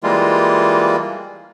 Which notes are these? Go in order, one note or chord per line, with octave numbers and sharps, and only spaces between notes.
E3 G3 G#3 A#3 F4